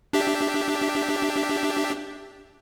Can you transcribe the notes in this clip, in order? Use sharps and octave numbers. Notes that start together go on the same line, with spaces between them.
D4 G4 E5